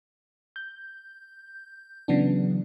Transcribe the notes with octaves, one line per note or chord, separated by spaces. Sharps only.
G6
C#3 E3 F#3 B3 D4